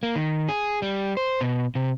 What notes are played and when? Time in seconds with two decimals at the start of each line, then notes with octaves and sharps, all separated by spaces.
0.03 A#3
0.16 D#3
0.49 G#4
0.82 G3
1.17 C5
1.41 B2
1.75 C3